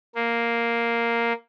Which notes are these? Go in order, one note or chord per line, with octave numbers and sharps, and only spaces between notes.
A#3